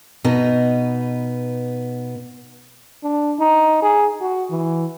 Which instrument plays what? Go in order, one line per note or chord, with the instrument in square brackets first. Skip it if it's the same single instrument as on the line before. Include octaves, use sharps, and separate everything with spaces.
[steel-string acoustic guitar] B2 B3 D#4 A#5
[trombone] D4
D#4
G#4
F#4
E3